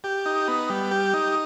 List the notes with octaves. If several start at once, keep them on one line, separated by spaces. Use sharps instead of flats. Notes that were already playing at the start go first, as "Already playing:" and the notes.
G4
D#4
B3
G3
G4
D#4